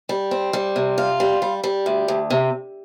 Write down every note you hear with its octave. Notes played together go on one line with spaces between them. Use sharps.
G3
C4
G3
C3
F4
G3
G3
G3
D2
D2
C3